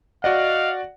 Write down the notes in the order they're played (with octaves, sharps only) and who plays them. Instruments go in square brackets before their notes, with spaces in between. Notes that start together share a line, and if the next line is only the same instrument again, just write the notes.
[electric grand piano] F#4 D5 F#5 [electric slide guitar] D#5 [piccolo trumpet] F5